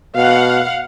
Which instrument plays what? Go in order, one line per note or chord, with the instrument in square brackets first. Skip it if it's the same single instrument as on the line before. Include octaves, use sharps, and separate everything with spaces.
[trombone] B2 [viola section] F5 F#5